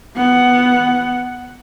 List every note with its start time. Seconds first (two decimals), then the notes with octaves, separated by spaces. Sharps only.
0.16 B3 F#5